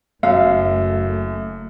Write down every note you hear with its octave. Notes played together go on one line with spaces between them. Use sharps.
F#1 F#2 A3 F5